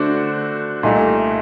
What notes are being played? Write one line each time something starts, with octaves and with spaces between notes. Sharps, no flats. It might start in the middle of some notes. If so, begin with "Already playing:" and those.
Already playing: D3 A3 D4 F#4 C5
C2 A#2 A3 D#4